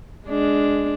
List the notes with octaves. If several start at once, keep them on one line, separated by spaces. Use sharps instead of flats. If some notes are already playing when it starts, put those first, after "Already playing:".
G#3 D4